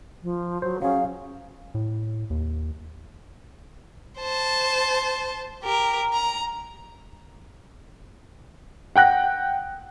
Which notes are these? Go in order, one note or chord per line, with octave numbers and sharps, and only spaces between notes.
F3
F#3 C5
F#3 C#4 G#4 F5
A2
D#2
C5 A5
G4 A#4
A#5
F#5 G5 F#6 A#6